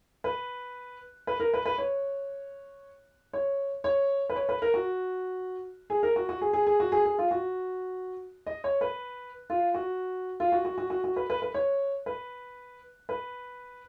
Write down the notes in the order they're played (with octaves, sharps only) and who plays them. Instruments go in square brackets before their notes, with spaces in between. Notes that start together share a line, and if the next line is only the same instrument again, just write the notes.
[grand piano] B4
B4
A#4
B4
B4
C#5
C#5
C#5
B4
C#5
B4
A#4
F#4
G#4
A#4
F#4
F#4
G#4
G#4
G#4
F#4
G#4
G#4
F4
F#4
D#5
C#5
B4
F4
F#4
F4
F#4
F#4
F#4
F#4
F#4
B4
B4
B4
C#5
B4
B4